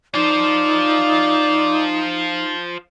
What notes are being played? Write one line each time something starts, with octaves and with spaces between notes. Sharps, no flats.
D#4 F4 C5 D5